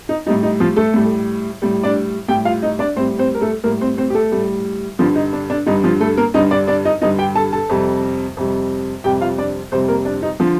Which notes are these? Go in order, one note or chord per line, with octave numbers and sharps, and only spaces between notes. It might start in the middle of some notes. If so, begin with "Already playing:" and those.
D#4
A2 G3 D#4
D#4
F3 F4
A3 A4
A2 G3
A2 G3
D4 D5
A2 G3 G4 G5
F4 F5
D#4 D#5
D4 D5
A2 G3 C4 C5
C4 C5
A#4
A3 A4
A2 G3 A#3 A#4
C4 C5
C4 C5
G4
A3 A4
A2 G3
G2 D3 F3 G3 F4
D#4
D4
D4
G2 D3 G3 D#4
F3 F4
A3 A4
A#3 A#4
G2 D3 G3 D#4 D#5
D4 D5
D4 D5
D#4 D#5
G2 D3 G3 D#4 D#5
G4 G5
A4 A5
A4 A5
F2 C3 G3
F2 C3 G3
F2 C3 G3 G4 G5
F4 F5
D4 D5
F2 C3 G3 C4 C5
A#3 A#4
D4
D#4
D3 F3 F4